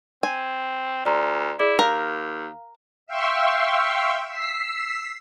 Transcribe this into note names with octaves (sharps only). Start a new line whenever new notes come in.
C4 G#5
D2 D5 A#5 C6
E4 G#4 D5 D6
D#2 A#4 F5
E5 F5 G5 C6 C#6 E6
E6 B6 C7